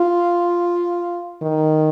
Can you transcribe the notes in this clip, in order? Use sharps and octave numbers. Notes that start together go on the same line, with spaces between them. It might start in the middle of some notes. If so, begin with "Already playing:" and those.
Already playing: F4
D#3